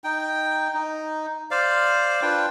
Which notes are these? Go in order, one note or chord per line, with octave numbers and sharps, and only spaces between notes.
D#4 G5
D#4
C5 D5 F5
D4 F4 B4 G5